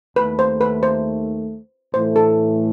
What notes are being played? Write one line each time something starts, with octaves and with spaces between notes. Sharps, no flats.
D#2 D#3 A3 B4
C5
B4
C5
A2 E3 A3 C5
A4